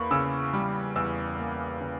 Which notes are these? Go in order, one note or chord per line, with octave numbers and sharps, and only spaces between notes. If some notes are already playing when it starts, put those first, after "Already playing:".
Already playing: E2 A#3 B5 C#6
C#3 E6
G3
E2 E6
A#3
C#3